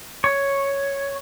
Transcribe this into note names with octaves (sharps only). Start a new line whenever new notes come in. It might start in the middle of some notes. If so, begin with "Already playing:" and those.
C#5